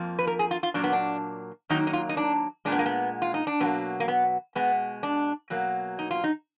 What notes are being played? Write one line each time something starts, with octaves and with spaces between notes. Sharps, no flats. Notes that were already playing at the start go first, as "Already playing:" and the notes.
Already playing: F2 F3 A#3
B4
A#4
G#4
F4
F4
A#2 F#3 A#3 D4
B3
D4
F#2 D#3 F#3 A#3 D#4
D#4
F4
D#4
D4
A#2 G#3 D4
B3
A#3
B3
F4
D#4
D4
B2 F#3 A#3 B3
A#3
B3
B2 G#3 B3
D4
B2 F#3 A#3
D#4
F4
D#4